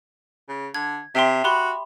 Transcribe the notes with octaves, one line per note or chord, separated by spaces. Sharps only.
C#3
D3 G#6
C3 E5 G5 C6
F#4 G4 B5 C6